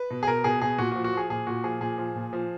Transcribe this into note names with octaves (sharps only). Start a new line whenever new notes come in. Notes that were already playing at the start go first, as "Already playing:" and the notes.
Already playing: B4
B2
G#4
B2 A#4
B2 G#4
B2 G#4
A#2 F#4
F#4
F3
F#4
F3 G#4
A#2 G#4
A#2 F#4
F3 G#4
A#2 G#4
F3
A#2
F3